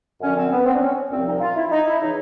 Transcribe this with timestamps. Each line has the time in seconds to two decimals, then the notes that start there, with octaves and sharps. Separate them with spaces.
0.20 F#2 D3 F3 C#4
0.35 C4
0.51 B3
0.66 C4
0.75 D4
0.81 C#4
1.10 C2 A#2 F3 C4
1.26 D#4
1.40 F4
1.56 E4
1.71 D#4
1.85 E4
2.00 C#3 E3 D#4